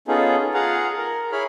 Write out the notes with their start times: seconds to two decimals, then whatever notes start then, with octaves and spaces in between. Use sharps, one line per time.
0.08 B3 C#4 D#4 F4 G#4 A4
0.54 F4 G#4 F5 F#5 A#5
0.98 A#4
1.32 E4 G#4 C#5 B5 F6